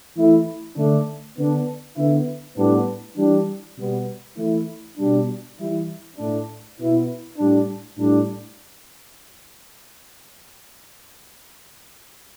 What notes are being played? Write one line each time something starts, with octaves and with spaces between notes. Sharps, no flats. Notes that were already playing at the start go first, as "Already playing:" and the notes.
E3 A3 E4
D3 A3 D4
D3 B3 D4
D3 B3 E4
A2 G3 B3 D4
E3 G3 D4
B2 G3 B3
E3 A3 E4
B2 G3 D4
E3 G3 E4
A2 A3 D4
B2 B3 E4
A2 G3 D4
A2 G3 D4